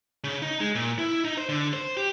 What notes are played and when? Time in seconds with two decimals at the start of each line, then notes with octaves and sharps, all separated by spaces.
0.24 C#3
0.42 D#4
0.60 G#3
0.75 A#2
0.99 E4
1.25 D#4
1.38 C5
1.49 D3
1.73 C5
1.97 G4